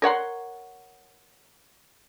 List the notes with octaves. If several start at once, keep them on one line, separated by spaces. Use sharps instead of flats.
A#4 C#5 F#5 C6